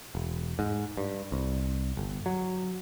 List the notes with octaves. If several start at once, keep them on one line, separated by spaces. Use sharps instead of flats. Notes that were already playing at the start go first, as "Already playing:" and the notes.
E1
G#2
G2
C2
G1
F#3